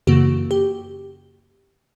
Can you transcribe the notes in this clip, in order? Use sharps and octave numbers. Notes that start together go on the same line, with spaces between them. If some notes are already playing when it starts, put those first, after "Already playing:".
F#2 C#3 E3 A#3 F#4
G4